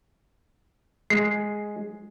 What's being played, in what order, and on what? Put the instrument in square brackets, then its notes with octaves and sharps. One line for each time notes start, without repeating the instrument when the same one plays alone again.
[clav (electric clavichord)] G#3 [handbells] C7